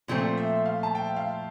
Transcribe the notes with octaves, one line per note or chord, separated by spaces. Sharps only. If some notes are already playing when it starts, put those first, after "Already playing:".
A#2 F3 A3 C4 C5
E5
F5
A5
G5
F5